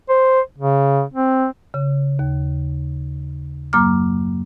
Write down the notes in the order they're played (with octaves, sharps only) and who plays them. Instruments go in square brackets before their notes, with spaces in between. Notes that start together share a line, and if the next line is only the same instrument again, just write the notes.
[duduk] C5
C#3
C4
[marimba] C#3
D#2
F#2 F#3 A#3 A#5 D6 F6